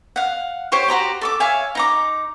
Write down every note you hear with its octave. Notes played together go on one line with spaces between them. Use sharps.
F5 F#5
G4 C5 C#5 C#6
F#4 G4 A#5 C6
A4 C#6 D6
C#5 E5 F5 G#5
D#4 A#5 D6